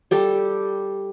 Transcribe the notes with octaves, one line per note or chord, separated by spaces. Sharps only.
G3 G4 A4